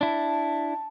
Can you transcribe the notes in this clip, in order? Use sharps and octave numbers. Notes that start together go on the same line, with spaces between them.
D4 E4 A5